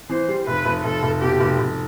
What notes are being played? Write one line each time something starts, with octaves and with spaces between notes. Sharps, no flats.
E3 C5
G3
F1 B4
F1
F1 A4
F1
B2 G4
F1
F1